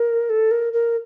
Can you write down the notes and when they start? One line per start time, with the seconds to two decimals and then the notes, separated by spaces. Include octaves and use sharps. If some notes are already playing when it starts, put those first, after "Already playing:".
Already playing: A#4
0.30 A4
0.51 A#4
0.73 A#4